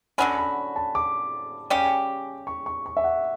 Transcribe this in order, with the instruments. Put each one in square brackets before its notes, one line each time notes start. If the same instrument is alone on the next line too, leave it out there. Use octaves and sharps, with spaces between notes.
[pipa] D3 F#3 C#4 F#4 [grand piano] B5
[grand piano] B5
A5
D6
[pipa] C#3 G3 C#4 G4
[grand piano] C#6
C#6
C#6
E5
F#5